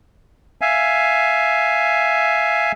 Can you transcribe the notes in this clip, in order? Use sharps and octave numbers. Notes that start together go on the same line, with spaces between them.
E5 F5 G#5